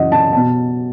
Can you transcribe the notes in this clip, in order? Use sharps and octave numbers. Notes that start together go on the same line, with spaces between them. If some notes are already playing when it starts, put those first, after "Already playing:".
Already playing: F#2 C#3 E3 D#5 F#5
A5
B2 A5